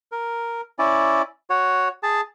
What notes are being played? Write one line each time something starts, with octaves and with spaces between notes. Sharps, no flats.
A#4
C#4 E4 D5
F#4 C#5
G#4 A5